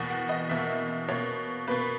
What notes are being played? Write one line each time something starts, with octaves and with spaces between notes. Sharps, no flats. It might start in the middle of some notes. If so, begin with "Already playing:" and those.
Already playing: E2 B2 A#3 F#5
F#5
D#5
E2 B2 A#3 E5
B2 A#3 C#5
B2 A#3 B4